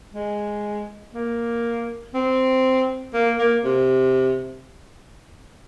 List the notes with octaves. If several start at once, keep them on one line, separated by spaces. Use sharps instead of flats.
G#3
A#3
C4
A#3
A#3
C3